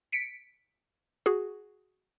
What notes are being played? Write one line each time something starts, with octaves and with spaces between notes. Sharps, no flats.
B6 C#7 D7
F#4 G#4